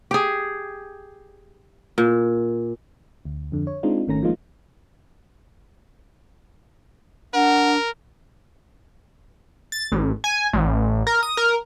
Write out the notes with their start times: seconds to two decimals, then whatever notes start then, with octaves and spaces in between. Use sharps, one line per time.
0.11 G4 G#4
1.98 A#2
3.25 D2
3.52 F2 D3
3.67 C#5
3.83 G#3 C4 D4 D#4 F4
4.08 G#1 D#3 A3 C#4 A#5 A#6
4.23 F3 G#3 A#3 D#4 F4
7.34 D4 A#4 F#5
9.72 A6
9.92 A1
10.24 G#5
10.53 A1
11.07 A#4
11.23 D#6
11.37 A#4